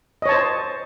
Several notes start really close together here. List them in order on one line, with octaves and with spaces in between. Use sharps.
D#5 C#5 A5 C5